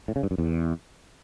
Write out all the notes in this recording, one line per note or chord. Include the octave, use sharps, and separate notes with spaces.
A2
C#3
G2
F#2
E2